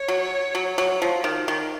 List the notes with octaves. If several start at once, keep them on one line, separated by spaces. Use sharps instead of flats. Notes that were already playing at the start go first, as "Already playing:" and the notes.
Already playing: C#5
F#3
F#3
F#3
F3
D#3
D#3